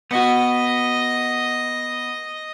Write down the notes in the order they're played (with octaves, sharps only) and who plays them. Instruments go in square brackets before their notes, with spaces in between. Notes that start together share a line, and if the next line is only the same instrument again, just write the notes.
[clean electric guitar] B3 F#4 [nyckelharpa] D#5